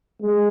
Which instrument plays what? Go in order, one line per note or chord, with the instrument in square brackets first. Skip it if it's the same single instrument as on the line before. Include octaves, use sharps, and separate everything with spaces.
[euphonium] G#3